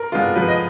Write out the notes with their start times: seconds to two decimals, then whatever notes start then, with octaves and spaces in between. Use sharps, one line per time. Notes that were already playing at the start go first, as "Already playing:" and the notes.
Already playing: A#4
0.12 G#3 B3 D4 F4
0.36 F3 B4
0.48 D#5